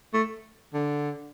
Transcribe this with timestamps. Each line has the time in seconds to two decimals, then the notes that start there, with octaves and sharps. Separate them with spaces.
0.14 A3
0.74 D3